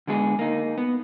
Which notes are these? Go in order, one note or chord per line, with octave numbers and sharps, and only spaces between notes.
D3 G#3 B3 G#4
A#3 D#4
B3